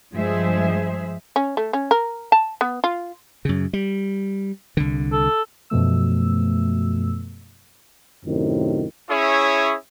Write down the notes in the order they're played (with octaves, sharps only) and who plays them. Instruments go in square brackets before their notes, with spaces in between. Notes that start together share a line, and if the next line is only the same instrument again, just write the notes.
[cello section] G2 F3 G#3 G#4 C5 E5
[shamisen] C#4
A3
C#4
A#4
A5
B3
F4
[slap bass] F#2 C#3
G3
C2 D3
[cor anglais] A4
[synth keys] F#2 B2 F3 A3 E6
[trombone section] F#2 A2 C3 D#3
[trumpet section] C#4 E4 G#4 C#5 E5 D#6